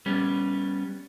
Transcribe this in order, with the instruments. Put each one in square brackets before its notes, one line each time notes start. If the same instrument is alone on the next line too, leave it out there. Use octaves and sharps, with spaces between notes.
[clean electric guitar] G3 B3 C#4